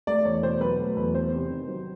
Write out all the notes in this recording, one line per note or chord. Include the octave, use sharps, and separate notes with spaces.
A3 D5
E2 C#5
B2 C5
F#3 B4
A3
E2 B4
B3 C5
C3
D#3
F#3